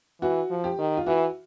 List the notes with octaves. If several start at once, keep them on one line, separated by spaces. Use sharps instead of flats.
E3 F#4
F3
G4
D#3
F4
E3 F#4